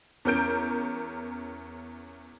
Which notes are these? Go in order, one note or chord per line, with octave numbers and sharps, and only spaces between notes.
E2 C#4 A#4 G6 D7